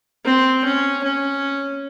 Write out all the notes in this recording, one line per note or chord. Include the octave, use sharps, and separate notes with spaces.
C4
C#4
C#4